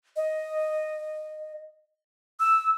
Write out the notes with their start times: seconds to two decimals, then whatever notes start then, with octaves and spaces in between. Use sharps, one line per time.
0.16 D#5
2.40 E6